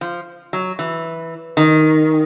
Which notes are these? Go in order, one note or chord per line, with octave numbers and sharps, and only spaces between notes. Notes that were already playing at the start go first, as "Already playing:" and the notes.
F3
F#3
E3
D#3